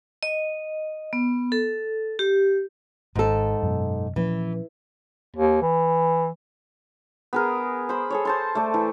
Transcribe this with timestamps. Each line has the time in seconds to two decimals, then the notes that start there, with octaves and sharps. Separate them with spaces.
0.23 D#5
1.13 B3
1.52 A4
2.19 G4
3.15 G#1 G#2 A4
3.62 F#2 B2
4.16 A#2 E3 F3 C#4
5.36 D#2
5.62 E3
7.33 B3 G#4 A#4
7.89 C5 B5
8.10 G#4 A4 C#5
8.25 C5 A5 C6
8.55 A3 D5
8.74 E3